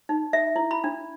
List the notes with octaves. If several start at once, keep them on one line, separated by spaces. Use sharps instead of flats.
D#4
E5
E4
B5
D4